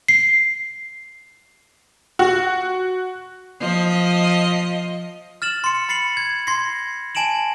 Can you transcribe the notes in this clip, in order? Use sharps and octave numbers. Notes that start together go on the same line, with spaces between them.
C7
F#4
F3 D#5
F6 A6 E7 F#7
C6 C#7
B5 A6 C7 C#7 F#7
G#6
C6 G#6 A#6 C7
G#5 A5 D7 E7 F#7